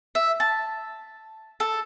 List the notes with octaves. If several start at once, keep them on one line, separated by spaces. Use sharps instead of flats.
E5
A5
A4